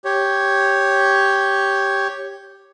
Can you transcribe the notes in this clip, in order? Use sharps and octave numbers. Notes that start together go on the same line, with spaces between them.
G4 C#5